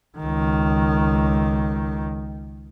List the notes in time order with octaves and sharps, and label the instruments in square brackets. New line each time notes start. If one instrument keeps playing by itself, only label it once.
[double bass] C#2 D#3